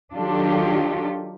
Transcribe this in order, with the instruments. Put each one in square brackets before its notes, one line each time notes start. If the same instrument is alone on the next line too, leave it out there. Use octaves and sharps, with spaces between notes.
[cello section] D#3 F#3 D4 F4 G4 A4